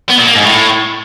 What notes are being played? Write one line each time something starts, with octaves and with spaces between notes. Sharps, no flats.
B3
A#2
A#3
G#2
A2